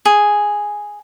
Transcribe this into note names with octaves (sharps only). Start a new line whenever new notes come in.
G#4